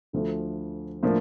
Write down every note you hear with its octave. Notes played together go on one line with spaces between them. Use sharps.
D2 D3 F3 A3
A2 F3 A#3 D4